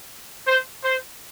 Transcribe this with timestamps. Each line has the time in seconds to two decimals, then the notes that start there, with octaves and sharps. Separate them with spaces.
0.46 C5
0.83 C5